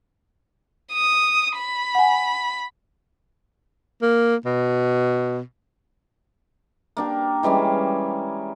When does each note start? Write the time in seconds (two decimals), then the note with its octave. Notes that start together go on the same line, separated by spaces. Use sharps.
0.93 D#6
1.58 B5
1.95 F#5 G#5
4.02 A#3
4.45 B2
6.97 A#3 D4 G4
7.43 E3 G3 G#3 C#4